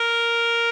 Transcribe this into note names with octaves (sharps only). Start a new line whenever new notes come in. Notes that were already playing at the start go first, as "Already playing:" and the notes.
Already playing: A#4